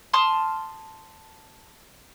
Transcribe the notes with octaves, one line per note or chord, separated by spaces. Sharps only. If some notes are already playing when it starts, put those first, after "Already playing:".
A5 C6 D#6 F6